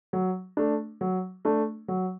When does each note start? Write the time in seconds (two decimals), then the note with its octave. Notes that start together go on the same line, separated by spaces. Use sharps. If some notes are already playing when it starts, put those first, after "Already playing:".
0.13 F#3
0.57 A3 D4
1.01 F#3
1.45 A3 D4
1.88 F#3